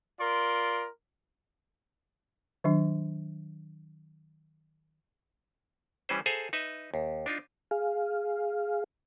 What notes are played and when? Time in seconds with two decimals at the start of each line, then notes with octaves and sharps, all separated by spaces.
0.20 F4 A#4 D5 C6
2.64 D#3 F#3 D4
6.09 E3 G3 C#4 B4 C5
6.26 G#4 A4 C5 F5 G#5 A#5
6.53 D#4 B4 E5
6.94 D#2
7.26 D4 D#4 F4
7.71 G#4 F5